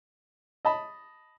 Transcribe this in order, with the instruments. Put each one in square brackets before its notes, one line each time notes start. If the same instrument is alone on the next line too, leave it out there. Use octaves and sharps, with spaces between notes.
[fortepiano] D#5 A5 B5